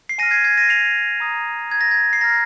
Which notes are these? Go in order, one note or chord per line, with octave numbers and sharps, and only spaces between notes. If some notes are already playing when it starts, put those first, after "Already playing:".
C7
G#5 F6 A#6 D#7
G#6 C7
G#6 C7
A#6 D#7
C7 F7
A#5 D#6
G#6
A#6
G#6
C7
A#5 F6 A#6